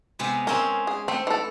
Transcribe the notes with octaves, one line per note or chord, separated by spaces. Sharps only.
C3 G#3 B3
G#3 C4 C#4 A#4
G#4
A3 C4
E3 A4